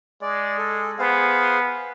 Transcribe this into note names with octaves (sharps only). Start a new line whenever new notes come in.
G#3 D5
A4
B3 G#4 C5 F5